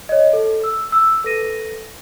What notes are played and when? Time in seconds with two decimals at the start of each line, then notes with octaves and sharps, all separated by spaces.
0.09 C#5 D#5
0.33 A4
0.64 E6
0.92 E6
1.24 A4 B4 A#6 D#7